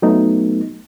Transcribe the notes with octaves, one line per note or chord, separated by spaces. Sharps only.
F#3 A3 B3 D#4